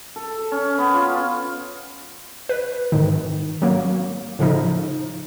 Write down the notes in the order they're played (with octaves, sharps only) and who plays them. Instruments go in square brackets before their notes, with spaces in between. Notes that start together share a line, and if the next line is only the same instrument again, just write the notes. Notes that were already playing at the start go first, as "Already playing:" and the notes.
[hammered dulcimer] A4
C#4
B3
F4
[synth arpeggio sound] B4
G#2 D#3
F#3 A#3
A2 C#3 F3 D#4